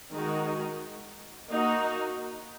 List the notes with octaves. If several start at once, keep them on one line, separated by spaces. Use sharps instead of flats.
D#3 G#3 D#4 F#4
A#3 D#4 F#4